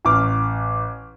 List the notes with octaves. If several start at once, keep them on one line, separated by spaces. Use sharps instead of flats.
A1 D6 F6